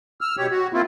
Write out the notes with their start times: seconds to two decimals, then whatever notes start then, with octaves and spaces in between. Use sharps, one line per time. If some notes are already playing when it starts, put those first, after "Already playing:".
0.21 E6 F6
0.37 B2 G4 C#5
0.50 F#4
0.73 A#3 C4 E4 F4